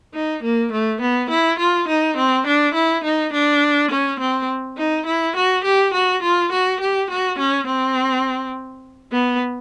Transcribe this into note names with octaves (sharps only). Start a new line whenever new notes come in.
D#4
A#3
A3
B3
E4
F4
D#4
C4
D4
E4
D#4
D4
C#4
C4
D#4
E4
F#4
G4
F#4
F4
F#4
G4
F#4
C#4
C4
B3